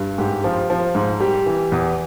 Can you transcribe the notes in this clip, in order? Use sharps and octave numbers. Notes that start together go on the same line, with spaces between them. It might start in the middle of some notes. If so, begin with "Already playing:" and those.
Already playing: G2 G3
G#2 G4
F3
F3
G#2
G3 G4
E3
E2